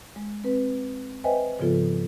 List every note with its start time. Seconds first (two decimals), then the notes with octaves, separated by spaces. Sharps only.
0.16 G#3
0.44 C4 B4
1.24 B4 C5 D#5 E5 G5 G#5
1.59 G#2 C#3 F3 B3 F4 A4